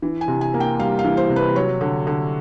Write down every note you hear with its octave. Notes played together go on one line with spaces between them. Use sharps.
E3
G#5
C3
G#5
A#3
G5
G3 F5
F5
E3
C5
C3
B4
F#3 C#5
D3
D3